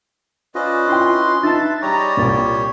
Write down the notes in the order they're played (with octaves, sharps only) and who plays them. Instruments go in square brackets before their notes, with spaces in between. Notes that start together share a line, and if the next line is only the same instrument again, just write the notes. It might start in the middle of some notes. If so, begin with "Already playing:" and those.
[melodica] C#4 B4 D#5 [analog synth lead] F4 [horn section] C5 D5
[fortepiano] E4 G5 [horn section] C6
[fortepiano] D#4 A5 [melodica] B4 E5 [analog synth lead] A6
[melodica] G3 G4 C#5 [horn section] G#4 D#5 A#5 [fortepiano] D6
[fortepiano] C2 A#2 [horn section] C4 F4